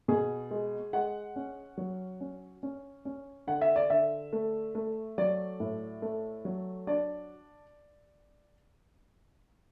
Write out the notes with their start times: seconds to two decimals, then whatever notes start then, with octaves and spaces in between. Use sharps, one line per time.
0.08 B2 G#4
0.51 G#3
0.93 G#3 F#5
1.36 C#4
1.78 F#3
2.21 C#4
2.63 C#4
3.05 C#4
3.47 D3 F#5
3.61 E5
3.76 D5
3.90 D3 E5
4.33 A3
4.75 A3
5.18 F#3 D5
5.60 A2
6.02 A3
6.45 F#3
6.87 D4 D5